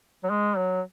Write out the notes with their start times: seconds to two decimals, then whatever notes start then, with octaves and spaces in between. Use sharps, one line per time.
0.23 F#3
0.30 G#3
0.57 F#3